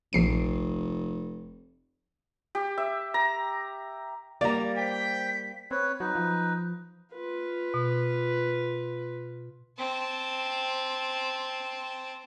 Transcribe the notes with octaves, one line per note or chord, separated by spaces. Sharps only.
F1 A#1 C7 D7
G4
E5
A#5
G3 A#3 D5 A#5
C5 G5 B6
C4 B4 C#5
F#3 D#4 B4
F3
F4 B4
B2
C4 A5